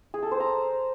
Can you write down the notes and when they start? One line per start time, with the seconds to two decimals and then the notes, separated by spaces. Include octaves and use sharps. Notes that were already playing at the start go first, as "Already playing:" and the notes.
0.14 G#4
0.23 A4
0.31 C5
0.40 A#5